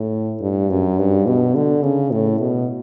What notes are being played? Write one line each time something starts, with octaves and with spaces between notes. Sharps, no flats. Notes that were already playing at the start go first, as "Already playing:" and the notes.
Already playing: A2
G2
F#2
G2
B2
D3
C#3
A2
B2